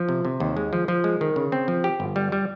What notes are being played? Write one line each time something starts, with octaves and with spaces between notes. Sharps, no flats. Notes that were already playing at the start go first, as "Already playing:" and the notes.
Already playing: F3
C3
C3
D#2
G#3
F3
F3
G#3
D#3
C#3
C4
F3
G4
G1
G3
G3